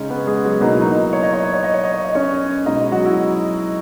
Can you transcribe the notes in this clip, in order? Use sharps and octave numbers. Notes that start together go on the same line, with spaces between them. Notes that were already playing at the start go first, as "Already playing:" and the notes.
Already playing: C#3 G#3 C#4 D#4 G#4 C#5
B3 B4
G#3 G#4
F#3 F#4
B2 F#3 A#3 D#4
E4
D#4
C#5
D#5
C#5
D#5
C#5
D#5
C#5
D#5
C#5
D#5
C#4 C#5
B2 G#3 D#4 D#5
F#3 F#4
E4